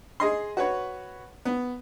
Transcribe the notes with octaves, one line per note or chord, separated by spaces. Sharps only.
G#4 D#5 C6
F#4 B4 C#5
B3